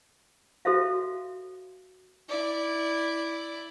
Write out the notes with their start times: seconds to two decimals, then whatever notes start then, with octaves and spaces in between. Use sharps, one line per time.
0.65 F#4 A4 C5 E5 F5
2.29 E4 D5